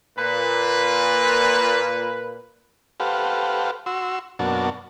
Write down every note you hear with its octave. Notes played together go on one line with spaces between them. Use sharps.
A#2 B4
G4 A4 B4 C5 F5 F#5
F#4 C6 E6
F#2 B2 A#3 D4 F#4 A5